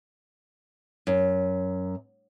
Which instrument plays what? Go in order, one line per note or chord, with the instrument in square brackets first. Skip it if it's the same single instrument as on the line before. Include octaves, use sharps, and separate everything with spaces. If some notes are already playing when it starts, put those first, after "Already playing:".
[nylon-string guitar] F#2